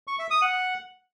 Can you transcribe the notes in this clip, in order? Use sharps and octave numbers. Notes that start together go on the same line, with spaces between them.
C#6
E5
D#6
F#5